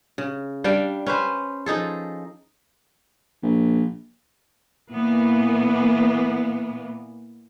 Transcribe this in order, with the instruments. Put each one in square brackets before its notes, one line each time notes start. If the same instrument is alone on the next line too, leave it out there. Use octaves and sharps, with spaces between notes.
[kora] C#3
G3 D4 F5 G5
C#4 B4 C5
F3 D#4 G#4 A4
[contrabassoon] A#1
[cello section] A#2 E3 A#3 B3